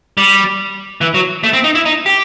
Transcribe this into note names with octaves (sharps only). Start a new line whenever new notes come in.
G3
E3
F#3
A3
C4
D#4
E4
D#4
G4